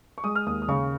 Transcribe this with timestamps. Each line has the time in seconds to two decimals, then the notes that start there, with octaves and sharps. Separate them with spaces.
0.18 C#6
0.24 G#3 D#6
0.35 F6
0.46 D#2 D#6
0.62 D#6
0.68 C#3 C#6